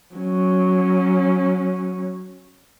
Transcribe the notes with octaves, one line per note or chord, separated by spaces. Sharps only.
F#3 C#4